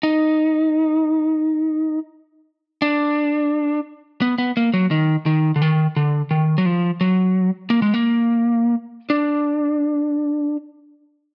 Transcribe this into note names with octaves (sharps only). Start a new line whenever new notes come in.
D#4
D4
B3
B3
A#3
F#3
D#3
D#3
D3
D#3
D3
D#3
F#3
F3
F#3
A#3
G#3
A#3
D4